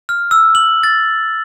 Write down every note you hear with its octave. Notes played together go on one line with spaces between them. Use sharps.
F6
E6
F#7
A6